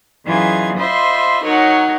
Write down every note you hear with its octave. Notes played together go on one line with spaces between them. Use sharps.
F#2 E3 D#4 F4 G#4 G#6
F4 C5 D#5 E5 B5 C6
F#3 D#4 A#4 C#5 F#5